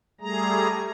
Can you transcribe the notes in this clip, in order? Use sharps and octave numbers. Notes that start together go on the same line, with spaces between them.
G3 A3 G#4 A#5